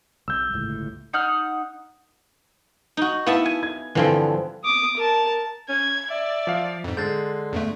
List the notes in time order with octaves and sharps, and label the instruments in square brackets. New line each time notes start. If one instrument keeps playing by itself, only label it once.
[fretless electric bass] C2 [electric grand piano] E6 G6
[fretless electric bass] G1 C#2 A2
[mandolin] D#4 F#5 F6
[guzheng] D#4 F#4
[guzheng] B3 E5 A5 [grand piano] E4 F5
[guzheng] G#5
[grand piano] G#6
[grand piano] G2 D3 [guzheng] E3 F3 C4
[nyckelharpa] D6 D#6
A#4 A5
[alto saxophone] C#4 [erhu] G#6
[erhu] D5 [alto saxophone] E5
[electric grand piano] F3 F5
[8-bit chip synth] F2 G#2
[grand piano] D3 G#3 [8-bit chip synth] G6 A6
[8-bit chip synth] E2 G2 A3